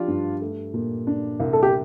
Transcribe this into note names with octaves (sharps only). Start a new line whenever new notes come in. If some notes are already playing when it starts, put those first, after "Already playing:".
Already playing: F3 D4 F4 G4
G2
A3
A#2
D4
C2
A4
G4